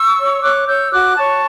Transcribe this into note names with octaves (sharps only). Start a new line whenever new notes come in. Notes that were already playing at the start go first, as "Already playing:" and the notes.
Already playing: C#6 E6
C#5
C#5 D6 F#6
C#5 E6 G6
F#4 D6 F#6
C#5 A5 C#6